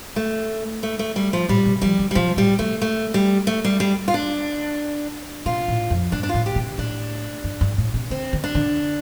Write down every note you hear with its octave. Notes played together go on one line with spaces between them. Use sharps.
A3
A3
A3
G3
F3
A2 G3
C3
F3 G3
D3
G3
C3 F3
A2 G3
C3 A3
A3
G3
A3
G3
G3
F4
D4
C3 F4
A2
F2
G2 D4
D4
A2 F4
G4
C3
A2 D4
G2
G2
A2
C3
D3 C4
D3
D4
D3